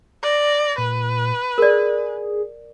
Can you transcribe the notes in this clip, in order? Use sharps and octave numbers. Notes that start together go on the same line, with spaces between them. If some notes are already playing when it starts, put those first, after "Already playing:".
D5 A#6
A#2 B4
G#4 A#4 D5